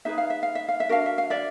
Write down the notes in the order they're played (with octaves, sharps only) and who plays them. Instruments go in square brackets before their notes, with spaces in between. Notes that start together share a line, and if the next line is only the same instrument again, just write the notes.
[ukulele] D#4 G#4 B4 E5
F5
E5
F5
E5
F5
E5
D4 F#4 A#4 F5
E5
F5
D5 E5